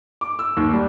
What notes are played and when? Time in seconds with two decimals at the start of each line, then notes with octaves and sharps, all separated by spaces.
0.21 D6
0.39 E6
0.57 D#2
0.73 G3